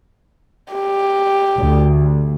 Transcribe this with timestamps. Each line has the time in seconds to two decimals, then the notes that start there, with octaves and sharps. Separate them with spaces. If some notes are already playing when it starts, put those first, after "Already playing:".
0.73 G4
1.57 D2